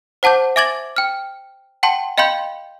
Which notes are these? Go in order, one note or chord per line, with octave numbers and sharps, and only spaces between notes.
C5 F#5 A5 D6 G6
E5 G#5 D6 G#6 A6 F#7
G5 F6
F#5 G5 A5 C6
D#5 F5 G5 B5 C6 G6